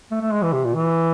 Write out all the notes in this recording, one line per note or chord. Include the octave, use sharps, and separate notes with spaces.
A3
A3
G#3
E3
C3
A#2
E3